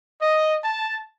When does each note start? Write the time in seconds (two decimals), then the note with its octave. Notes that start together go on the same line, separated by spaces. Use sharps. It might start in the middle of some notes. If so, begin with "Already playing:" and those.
0.21 D#5
0.64 A5